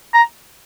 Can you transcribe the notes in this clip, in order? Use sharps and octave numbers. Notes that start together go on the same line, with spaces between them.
A#5